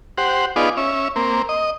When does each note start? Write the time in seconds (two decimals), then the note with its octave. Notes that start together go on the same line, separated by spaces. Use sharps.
0.18 G4 C5 F#5
0.56 B3 D#4 F4 G#4 D5
0.77 C#4 E5
1.16 A#3 C4
1.49 D#5